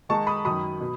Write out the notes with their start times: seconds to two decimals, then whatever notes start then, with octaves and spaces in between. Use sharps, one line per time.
0.09 D#3 G#3 D#4 A5 C#6
0.27 B5 D#6
0.45 F#2 D#3 F#3 B5 D#6
0.81 B2